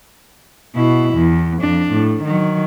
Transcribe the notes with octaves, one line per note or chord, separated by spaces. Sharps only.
B2 E4
E2
F2 D4
A2
D#3 F#3